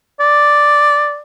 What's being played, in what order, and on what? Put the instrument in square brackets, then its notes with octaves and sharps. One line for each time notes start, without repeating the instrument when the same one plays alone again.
[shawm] D5